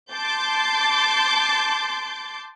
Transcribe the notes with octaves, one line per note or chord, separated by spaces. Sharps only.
A5 C6 D6 G6 A6